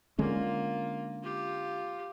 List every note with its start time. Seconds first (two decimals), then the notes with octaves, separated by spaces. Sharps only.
0.19 D3 G#3 A#3 C#4 F4
1.23 F4 G4